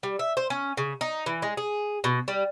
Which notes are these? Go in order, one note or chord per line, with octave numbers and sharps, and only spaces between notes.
G3
E5
C5
C#4
C#3
D#4
E3
G#3
G#4
B2
G3